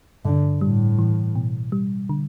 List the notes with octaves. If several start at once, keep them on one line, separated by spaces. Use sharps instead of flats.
G2 D3
A2 G3
E3
B2
G3
D3